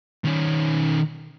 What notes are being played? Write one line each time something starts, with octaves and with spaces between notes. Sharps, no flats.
D#3 C#4